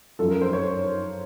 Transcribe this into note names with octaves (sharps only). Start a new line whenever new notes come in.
F#2 F3 A4
A#4
C5
C#5